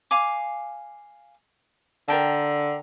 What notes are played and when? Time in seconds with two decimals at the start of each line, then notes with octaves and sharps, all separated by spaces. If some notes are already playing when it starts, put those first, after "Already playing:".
0.11 F5 G#5 D6
2.08 D3 A#4 G5 A5